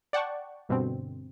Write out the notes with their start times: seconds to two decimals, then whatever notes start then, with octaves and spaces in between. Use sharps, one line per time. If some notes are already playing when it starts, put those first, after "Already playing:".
0.13 D5 F#5 G5 A5 C#6
0.69 G2 B2 D3 C4